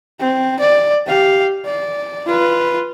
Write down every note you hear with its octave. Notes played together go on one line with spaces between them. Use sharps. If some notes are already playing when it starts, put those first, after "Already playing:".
C4
D5
G4 F5
D5
F4 B4